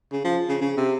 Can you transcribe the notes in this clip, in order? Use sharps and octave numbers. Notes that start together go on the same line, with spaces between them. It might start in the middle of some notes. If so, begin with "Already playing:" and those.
C#3
F3
C#3
C#3
C3